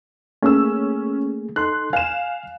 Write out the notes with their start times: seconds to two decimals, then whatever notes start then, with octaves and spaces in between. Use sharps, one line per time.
0.42 A3 A#3 C#4 G#4 E6
1.56 D#4 A4 C6 F#6
1.93 F5 G#5 E7